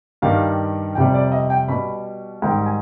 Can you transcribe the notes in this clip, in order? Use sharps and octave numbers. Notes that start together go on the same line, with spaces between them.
G2 D#3 G3 F5
F2 C3 G3 G5
D5
D#5
G5
B2 G3 B5
G#2 D#3 G3 G5
G#5